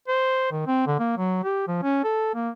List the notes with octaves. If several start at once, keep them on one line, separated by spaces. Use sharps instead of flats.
C5
D#3
C4
D3
A#3
F#3
G4
F3
C#4
A4
A#3